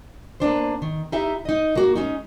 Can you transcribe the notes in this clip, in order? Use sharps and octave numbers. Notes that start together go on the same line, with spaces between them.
A#3 B3 D4 C5
D#3
D#4 E4 G4 E5
D#4 D#5
A#3 F#4
G#3 C#4 D#4